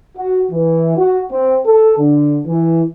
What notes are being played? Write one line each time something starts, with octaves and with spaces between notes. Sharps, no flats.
F#4
E3
F#4
C4
A4
D3
E3